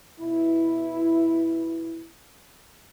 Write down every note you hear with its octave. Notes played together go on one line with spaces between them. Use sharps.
B2 E4